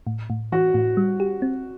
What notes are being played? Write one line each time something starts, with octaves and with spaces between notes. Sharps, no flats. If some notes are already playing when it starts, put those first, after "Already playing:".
A2
A2
E3 F#4
A2
G3
G4
C4